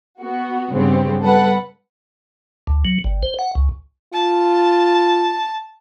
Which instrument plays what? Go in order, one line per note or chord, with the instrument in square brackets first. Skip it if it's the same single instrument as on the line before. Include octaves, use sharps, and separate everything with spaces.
[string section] B3 F#4
G2 C#3 B3 C4 G4
G3 A4 B4 F#5
[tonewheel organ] D2
F#3
G1
C5
F#5
C#2
[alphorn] F4 [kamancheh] A5